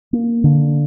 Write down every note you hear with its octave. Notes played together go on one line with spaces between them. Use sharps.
A#3
D3